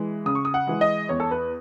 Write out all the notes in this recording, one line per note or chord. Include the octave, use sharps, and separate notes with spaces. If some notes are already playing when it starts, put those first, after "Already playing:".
Already playing: E3 G#3
C#3 D#6
C#6
D#6
F#5
E3 G#3
D#5
E2 C#5
A4
B4